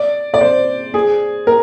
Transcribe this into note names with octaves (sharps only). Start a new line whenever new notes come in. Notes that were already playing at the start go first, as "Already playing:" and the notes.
Already playing: D5
D5
C5
G#4
A#4